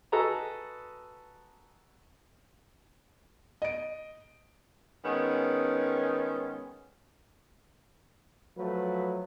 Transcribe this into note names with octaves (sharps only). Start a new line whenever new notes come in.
F#4 A4 B4 D#5 G#5 A#5
D#5 D7
D#3 G#3 B3 C#4
F3 F#3 A3 B4